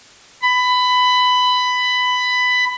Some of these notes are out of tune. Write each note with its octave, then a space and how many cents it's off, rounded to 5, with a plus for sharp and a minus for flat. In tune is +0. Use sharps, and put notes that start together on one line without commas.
B5 +15